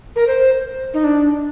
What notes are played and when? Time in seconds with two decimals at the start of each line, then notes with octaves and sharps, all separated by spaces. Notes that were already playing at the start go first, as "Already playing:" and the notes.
0.16 A#4
0.27 C5
0.94 D#4
1.04 D4